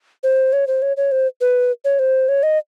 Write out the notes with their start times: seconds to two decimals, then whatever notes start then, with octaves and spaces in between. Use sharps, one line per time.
0.23 C5
0.53 C#5
0.67 C5
0.82 C#5
0.97 C#5
1.12 C5
1.41 B4
1.85 C#5
1.99 C5
2.29 C#5
2.43 D#5